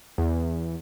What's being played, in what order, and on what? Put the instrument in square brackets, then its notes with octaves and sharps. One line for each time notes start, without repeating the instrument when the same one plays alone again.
[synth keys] E2